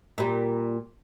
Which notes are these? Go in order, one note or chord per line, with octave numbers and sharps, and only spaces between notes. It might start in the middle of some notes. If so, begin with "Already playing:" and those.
A#2 G3